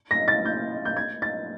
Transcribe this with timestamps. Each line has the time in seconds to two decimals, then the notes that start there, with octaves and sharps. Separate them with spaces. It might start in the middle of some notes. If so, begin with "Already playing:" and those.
0.11 A#6
0.28 A6
0.45 G6
0.85 G6
0.97 G#6
1.22 A6